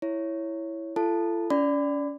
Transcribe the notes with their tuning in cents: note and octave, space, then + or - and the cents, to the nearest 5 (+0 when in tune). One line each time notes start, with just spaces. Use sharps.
E4 +0 C#5 +0
F4 -45 A4 +0 A5 +0
C#4 +35 D5 +0 B5 +35